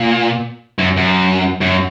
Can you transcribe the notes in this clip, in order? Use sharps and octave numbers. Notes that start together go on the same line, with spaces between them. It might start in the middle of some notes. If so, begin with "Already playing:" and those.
Already playing: A#2
F#2
F#2
F#2